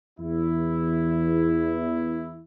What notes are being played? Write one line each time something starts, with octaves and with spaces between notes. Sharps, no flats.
E2 E4